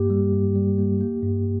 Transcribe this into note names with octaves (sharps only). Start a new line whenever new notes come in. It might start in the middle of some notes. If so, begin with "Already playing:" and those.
Already playing: G2 A#3 G4
G3
G2
G3
A#3
A#3
G2